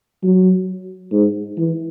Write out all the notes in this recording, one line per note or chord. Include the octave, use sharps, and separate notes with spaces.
F#3
G#2
E3